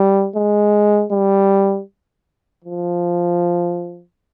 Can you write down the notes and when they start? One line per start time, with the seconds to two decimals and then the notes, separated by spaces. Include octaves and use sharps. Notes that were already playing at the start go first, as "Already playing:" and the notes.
Already playing: G3
0.36 G#3
1.12 G3
2.65 F3